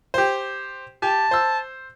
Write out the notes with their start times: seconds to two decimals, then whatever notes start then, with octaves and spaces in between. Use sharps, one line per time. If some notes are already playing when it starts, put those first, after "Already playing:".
0.14 G4 C5
1.02 G4 A5
1.31 C5 E6